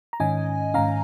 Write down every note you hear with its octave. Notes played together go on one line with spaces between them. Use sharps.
A#5
G#2 D#3 C#4 D#5 G#5
G#2 D#3 C#4 F5 A#5